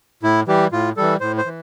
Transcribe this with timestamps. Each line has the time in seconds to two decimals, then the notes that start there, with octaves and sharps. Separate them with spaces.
0.23 A2 E4
0.48 E3 G3 G4
0.72 A2 F4
0.97 E3 G3 A4
1.21 A2 C5
1.38 C5
1.46 E3